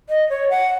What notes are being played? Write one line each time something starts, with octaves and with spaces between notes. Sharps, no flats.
D#5
C#5
F#5